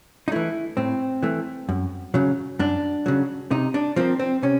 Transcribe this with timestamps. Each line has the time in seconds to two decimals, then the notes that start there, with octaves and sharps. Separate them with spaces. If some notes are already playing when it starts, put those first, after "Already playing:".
0.28 D#4
0.32 E3 A3 E4
0.77 A2 C4
1.23 E3 A3
1.69 F#2
2.14 C#3 F#3
2.59 F#2 D4
3.06 C#3 F#3
3.51 C3 D#4
3.74 D4
3.96 F3 A#3 C4
4.19 C4
4.43 C3 C#4